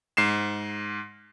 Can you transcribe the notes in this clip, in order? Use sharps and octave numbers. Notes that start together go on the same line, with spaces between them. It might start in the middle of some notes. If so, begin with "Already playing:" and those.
G#2 C7 E7